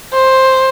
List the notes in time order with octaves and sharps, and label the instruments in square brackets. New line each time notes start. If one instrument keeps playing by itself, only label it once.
[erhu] C5